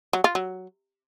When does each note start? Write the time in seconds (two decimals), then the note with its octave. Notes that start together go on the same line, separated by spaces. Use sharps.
0.13 F#3
0.24 F4
0.35 F#3